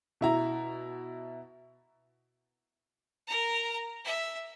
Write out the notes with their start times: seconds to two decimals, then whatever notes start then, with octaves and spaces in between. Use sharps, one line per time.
0.21 B2 E4 A#5
3.28 A#4 A#5
4.05 E5